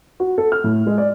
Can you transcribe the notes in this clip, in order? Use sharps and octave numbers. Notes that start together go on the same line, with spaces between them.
F#4
A4
F6
A2
G#3
D5